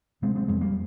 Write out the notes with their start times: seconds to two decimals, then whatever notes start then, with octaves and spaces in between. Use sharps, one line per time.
0.22 C3 G#3 C4
0.35 G#3 C4
0.48 F2 G#3 C4
0.61 G3 A#3